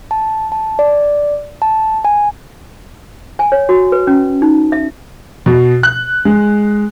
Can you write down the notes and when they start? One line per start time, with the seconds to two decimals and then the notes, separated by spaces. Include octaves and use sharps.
0.11 A5
0.52 A5
0.79 D5
1.62 A5
2.05 G#5
3.39 G#5
3.52 C#5
3.69 F#4
3.92 B4
4.07 C#4
4.42 D#4
4.72 E5
5.46 B2
5.83 F#6
6.25 G#3